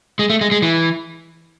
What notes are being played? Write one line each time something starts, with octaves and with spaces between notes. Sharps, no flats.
G#3
A3
G#3
G#3
E3